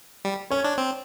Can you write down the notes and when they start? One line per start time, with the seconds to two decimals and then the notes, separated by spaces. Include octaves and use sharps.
0.25 G3
0.50 C#4 C#5
0.64 D4
0.78 C4